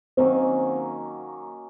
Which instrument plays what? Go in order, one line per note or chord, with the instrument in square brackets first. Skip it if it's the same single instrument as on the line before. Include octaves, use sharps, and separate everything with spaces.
[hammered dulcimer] D#3 F#3 A#3 C#4 [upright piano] C4